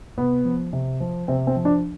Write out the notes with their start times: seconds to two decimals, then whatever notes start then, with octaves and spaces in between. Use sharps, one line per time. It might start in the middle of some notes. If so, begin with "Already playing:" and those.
0.18 C3 B3
0.45 F3
0.73 C3
1.00 F3
1.28 C3 C4
1.47 C4
1.56 F3
1.65 D4